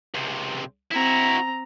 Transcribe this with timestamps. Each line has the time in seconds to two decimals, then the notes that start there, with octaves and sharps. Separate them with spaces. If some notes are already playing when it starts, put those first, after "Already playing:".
0.14 C#2 C3
0.92 C4 E4 F#4 A#5